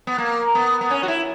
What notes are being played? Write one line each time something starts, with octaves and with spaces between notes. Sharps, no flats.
B3
A#3
B3
B3
C#4
F#4
E4